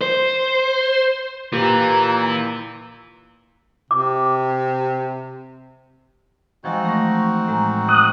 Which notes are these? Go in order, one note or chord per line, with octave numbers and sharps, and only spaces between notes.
C5
A#2 E3 G4 A#5
C3 D6
E3 F3 G#3 C4 D#4 F#4
A3 C#6 A#6
A2 G#3 A#5
D#6 F#6